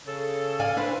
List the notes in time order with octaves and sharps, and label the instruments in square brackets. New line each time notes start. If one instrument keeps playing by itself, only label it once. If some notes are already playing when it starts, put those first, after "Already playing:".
[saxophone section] C#3 A4
[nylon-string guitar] D5 F5 G#5
D4 B4 C5